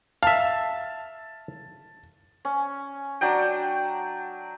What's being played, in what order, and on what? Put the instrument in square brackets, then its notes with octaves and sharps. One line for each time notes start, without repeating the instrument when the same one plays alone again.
[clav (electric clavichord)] E5 F5 [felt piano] A5
[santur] C#4
F#3 D4 G5